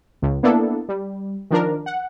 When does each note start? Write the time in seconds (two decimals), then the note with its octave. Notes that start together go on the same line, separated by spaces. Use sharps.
0.22 C#2
0.43 A#3 B3 D4 E4 A4
0.89 G3
1.51 D#3 F3 D4 A#4
1.86 F#5